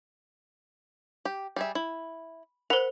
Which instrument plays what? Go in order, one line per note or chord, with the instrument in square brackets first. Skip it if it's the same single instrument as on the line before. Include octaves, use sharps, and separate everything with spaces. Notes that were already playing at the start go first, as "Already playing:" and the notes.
[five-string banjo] G4
G3 G#4 E5
E4
[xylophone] A#4 C5 [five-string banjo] F#5 B5